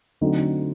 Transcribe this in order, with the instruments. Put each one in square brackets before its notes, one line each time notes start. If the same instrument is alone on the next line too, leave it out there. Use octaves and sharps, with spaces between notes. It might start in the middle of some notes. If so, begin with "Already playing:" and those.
[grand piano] D3 F#3 A3 C4 D#4